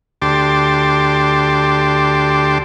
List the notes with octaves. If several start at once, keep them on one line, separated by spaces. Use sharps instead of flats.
D2 G4 A5 C6 D6